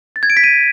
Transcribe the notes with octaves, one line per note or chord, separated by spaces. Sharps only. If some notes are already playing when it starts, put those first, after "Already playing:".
A6
G#6
D7
B6
D#7